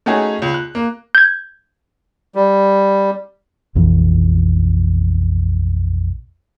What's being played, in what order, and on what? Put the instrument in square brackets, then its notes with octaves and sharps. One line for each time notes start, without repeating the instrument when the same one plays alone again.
[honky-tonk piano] A3 C#4 D#4 F#4 G#4
C#2
F#6
A#3
[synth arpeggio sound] G6 G#6
[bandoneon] G3
[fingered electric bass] A#1 F2 B2 E3